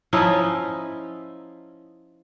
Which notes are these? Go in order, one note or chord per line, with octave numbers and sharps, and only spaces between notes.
F3 C#4 D#4 E4